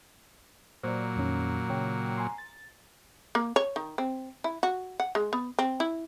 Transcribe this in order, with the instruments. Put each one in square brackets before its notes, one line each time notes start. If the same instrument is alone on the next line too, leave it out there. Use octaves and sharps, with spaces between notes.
[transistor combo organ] A#2 F#3 [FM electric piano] C5 D5
[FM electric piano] F2 D#3 C#4
C#3 C#5 G5
G#5 A#5 C6
A6
[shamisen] A#3
C#5
D#3
C4
E4
F#4
F#5
G#3
B3
C4
E4